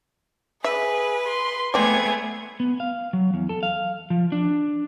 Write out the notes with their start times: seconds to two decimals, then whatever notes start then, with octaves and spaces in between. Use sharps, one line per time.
0.64 G#4 B4 E5
1.28 C6
1.74 A3 B3 C4 G#4 D5 G#6
2.60 B3
2.80 F5
3.13 F#3
3.34 E2
3.49 A4
3.63 F5
4.10 F3
4.32 D4